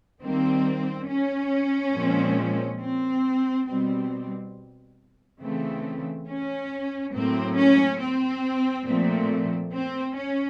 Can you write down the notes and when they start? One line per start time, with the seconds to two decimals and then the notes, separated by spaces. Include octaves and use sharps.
0.22 D#3 G3 A#3 C4
1.07 C#4
1.94 A#2 F3 G#3 C4
2.80 C4
3.68 B2 G3 C4
5.41 C#3 E3 A3 C4
6.27 C#4
7.13 A2 F#3 A#3 C4
7.57 C#4
8.00 C4
8.86 A#2 F3 A3 C4
9.73 C4
10.16 C#4